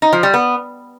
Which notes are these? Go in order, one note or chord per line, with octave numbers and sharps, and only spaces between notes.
D#4
F3
G3
B3